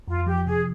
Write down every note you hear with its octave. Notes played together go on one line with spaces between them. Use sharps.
F2 F4
F3 G4
C3 G#4